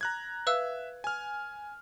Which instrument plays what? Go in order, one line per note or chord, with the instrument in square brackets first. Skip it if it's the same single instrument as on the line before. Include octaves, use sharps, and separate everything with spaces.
[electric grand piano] A#5 F#6 G#6
[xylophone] B4 F5 E6 [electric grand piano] E5
[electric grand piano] G#5 F6